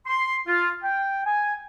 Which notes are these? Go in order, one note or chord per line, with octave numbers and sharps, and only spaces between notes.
C6
F4
G5
G#5